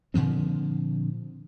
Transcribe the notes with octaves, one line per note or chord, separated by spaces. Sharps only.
A#2 D3 F3 C4